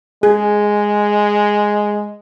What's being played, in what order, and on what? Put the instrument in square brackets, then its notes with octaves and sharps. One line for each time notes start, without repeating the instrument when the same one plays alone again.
[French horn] G#3 [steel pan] G#4